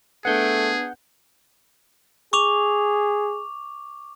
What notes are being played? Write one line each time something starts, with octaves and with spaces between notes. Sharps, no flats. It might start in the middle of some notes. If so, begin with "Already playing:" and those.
A3 B3 D4 G#4 B4 F#5 G6
G#4 C#6 D6 F7